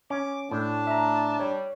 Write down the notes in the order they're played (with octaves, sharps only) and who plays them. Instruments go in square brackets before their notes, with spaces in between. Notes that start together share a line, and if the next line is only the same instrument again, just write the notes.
[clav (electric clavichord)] C#4 [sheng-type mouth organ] D6
[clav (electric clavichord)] A2 [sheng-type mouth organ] D4 [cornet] A5
[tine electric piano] E5 A#5
[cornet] G3 [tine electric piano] C#5